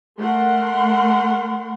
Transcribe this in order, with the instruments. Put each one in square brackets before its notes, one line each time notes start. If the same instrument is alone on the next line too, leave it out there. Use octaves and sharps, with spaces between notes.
[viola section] A3 A#4 F#5 C6